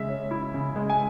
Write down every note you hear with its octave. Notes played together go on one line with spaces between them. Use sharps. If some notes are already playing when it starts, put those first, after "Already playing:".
Already playing: C#3 G#3 E5
C#4
E4
C#3
G#3
G#5